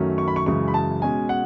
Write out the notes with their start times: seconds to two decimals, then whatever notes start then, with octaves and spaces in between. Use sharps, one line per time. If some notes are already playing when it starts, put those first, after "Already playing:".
Already playing: F#2 D#3 F#3 A3 C#4
0.18 C#6
0.28 B5
0.36 C#6
0.46 F#2 C#3 E3 G#3 C#6
0.68 B5
0.74 A5
1.02 B2 G#3 C#4 G#5
1.29 F#5